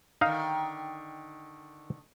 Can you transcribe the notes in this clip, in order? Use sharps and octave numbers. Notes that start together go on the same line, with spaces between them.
D3 D#3 D#4 F5